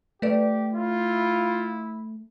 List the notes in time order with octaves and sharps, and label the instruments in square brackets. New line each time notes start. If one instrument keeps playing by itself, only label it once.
[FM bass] A3 [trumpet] G4 [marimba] B4 D5
[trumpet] E4 [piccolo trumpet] F4